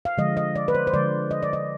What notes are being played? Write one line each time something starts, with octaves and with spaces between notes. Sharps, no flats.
F5
D3 F3 G#3 D#5
D#5
D5
B4
C5
C5
D3 F3 G#3 D5
D#5
D5
D#5